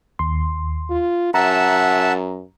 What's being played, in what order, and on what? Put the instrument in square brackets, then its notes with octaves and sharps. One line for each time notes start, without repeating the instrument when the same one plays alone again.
[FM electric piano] D#2 C6
[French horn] F4
[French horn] F#2 [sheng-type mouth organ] E5 F#5 A5 [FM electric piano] A#5